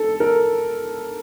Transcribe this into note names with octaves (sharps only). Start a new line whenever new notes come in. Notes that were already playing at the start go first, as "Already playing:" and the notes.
Already playing: A4
A#4